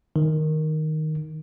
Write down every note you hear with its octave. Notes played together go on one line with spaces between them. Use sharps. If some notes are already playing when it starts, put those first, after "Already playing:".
D#3